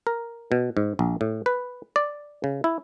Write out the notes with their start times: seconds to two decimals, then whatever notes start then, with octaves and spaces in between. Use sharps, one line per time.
0.07 A#4
0.52 B2
0.77 G#2
0.99 A#1
1.21 A2
1.46 B4
1.96 D5
2.44 C#3
2.64 E4